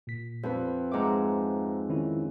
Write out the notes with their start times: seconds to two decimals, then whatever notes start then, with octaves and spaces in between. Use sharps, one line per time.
0.07 A#2 B6
0.43 F2 C4 B4
0.92 G#2 E5 F#5 A#5 D6
1.89 D#3 C#4 E4